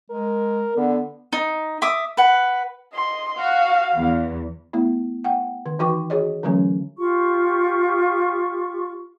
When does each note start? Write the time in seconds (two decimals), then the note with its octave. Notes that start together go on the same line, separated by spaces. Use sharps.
0.10 G#3 A#4
0.77 D3 B3
1.33 D#4
1.82 E5 D6 D#6
2.17 B4 F#5
2.93 D#5 C6
3.37 F#4 F5
3.96 E2
4.73 A3 B3 E4
5.24 F#5 G5
5.66 D#3
5.79 E3 D#4 F#4 G5 C#6 D6
6.10 F#4 G#4 C#5 D#5
6.43 D3 E3 F#3 A3 C#4
6.97 F4 G4 C#6